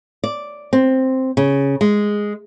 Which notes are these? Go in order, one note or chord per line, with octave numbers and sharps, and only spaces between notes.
D5
C4
C#3
G#3